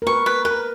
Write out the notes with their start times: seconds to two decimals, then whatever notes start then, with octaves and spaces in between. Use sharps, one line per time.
0.02 A#4
0.07 B4 C#6
0.26 B4
0.45 A#4 B4